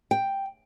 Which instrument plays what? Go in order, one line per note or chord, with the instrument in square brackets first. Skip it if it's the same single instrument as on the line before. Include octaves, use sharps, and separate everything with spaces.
[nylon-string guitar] G5